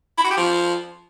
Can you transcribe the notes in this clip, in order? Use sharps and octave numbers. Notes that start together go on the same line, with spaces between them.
E4
F#4
G4
F3